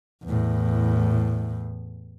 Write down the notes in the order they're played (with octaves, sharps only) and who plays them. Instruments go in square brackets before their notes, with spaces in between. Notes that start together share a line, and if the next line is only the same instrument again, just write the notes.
[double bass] E2 A2